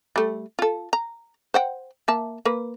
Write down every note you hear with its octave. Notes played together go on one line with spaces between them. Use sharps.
G3 A3
F4 A4
A#5
C5 F#5 G5
A#3 E5 A5
A#3 B4